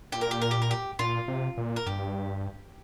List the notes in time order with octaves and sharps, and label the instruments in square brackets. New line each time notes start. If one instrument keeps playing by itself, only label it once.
[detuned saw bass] A#2 [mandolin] G4
[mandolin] A#4
G4
A#4
G4
A#4
G4
[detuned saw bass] A#2 [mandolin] F4
[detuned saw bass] C3
A#2
[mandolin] A#4
[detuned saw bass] G2 [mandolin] G4